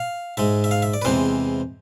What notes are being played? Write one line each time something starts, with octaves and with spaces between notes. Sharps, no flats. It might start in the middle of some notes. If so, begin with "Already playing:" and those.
Already playing: F5
G#2 G#3 E5
E5
F5
E5
D5
B4
E2 C3 E3 G#3 C5